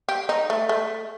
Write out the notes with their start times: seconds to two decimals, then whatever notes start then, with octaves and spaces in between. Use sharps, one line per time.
0.09 G4
0.29 D#4
0.50 A3
0.69 A3